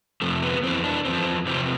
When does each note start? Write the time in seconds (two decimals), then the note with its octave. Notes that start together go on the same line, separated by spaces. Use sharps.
0.22 F2 C3 F3 A3
0.42 B3
0.63 F2 E3 C4
0.84 D4
1.05 E2 D3 F3 C4
1.46 E2 C3 F3 C4